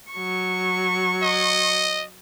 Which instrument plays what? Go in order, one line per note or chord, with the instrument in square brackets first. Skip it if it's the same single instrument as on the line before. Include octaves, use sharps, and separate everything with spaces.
[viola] F#3 C#6
[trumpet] D#5